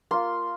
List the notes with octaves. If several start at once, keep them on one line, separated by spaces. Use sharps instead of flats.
A#3 F4 C6